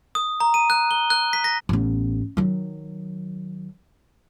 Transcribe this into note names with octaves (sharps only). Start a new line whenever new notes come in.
D#6
A#5
D#7
F#6
G7
F#6
B6
A#6
A1 B3
D#3 F#3